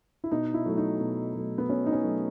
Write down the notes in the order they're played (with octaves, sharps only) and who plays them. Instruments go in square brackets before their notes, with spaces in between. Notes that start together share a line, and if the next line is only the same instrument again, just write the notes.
[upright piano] E4
B2 D#4
E4
F#3 A3
D#4
B2
F#3 A3
B3
B2 C#4
D#4
C#4
F#3 A3